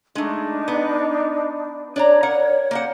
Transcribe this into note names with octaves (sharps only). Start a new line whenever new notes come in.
G#3 A3 D4 D#4
B3
D4 C#5 D5 A#5
A#4 F#5
A#3 C5 F#5